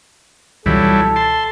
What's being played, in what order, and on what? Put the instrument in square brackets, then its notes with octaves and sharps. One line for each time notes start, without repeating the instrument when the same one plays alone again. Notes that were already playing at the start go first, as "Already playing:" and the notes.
[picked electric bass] C#2 B2 E3 [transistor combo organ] F#3 G3 E4 [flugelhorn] A4
[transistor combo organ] A5 C6